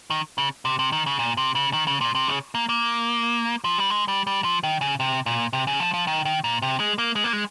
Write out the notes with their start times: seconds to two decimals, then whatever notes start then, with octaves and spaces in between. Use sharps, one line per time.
0.10 D#3
0.38 C#3
0.65 C3
0.79 C3
0.92 D#3
1.06 C#3
1.19 A#2
1.37 C3
1.55 C#3
1.73 D#3
1.87 C#3
2.01 A#2
2.15 C3
2.28 C#3
2.55 A#3
2.69 A#3
3.64 F3
3.78 G3
3.90 G#3
4.08 G3
4.27 G3
4.44 F3
4.63 D#3
4.81 C#3
5.00 C3
5.26 A#2
5.53 C3
5.67 C#3
5.80 F3
5.94 F3
6.07 D#3
6.25 D#3
6.44 A#2
6.62 C3
6.80 G#3
6.98 A#3
7.16 G#3
7.24 A#3
7.33 G#3